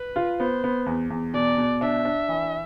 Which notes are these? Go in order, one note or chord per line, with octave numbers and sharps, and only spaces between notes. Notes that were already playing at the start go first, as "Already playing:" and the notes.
Already playing: B4
F4
B3 C5
B3
E2
E2
B2 D5
B2
D4 E5
D4
E3